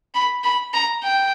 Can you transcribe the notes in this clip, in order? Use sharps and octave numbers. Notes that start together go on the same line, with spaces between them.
B5
B5
A#5
G5